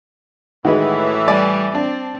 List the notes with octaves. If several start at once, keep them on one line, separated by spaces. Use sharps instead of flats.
A2 D#3 E3 G#3 F#4 B4
G3 D5 G#5
C4 D4